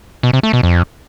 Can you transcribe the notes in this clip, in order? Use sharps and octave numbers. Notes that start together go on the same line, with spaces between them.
B2
C3
A3
B2
F2